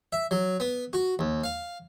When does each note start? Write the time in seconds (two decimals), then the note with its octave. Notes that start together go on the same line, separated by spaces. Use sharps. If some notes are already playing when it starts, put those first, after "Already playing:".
0.13 E5
0.31 F#3
0.60 B3
0.93 F#4
1.19 D#2
1.44 F5